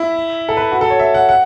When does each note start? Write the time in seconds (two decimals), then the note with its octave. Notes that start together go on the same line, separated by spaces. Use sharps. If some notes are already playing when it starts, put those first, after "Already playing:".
Already playing: E4
0.49 A4
0.57 B4
0.71 F#4
0.81 A4
0.90 C#5
1.00 E5
1.14 F#5
1.29 F#5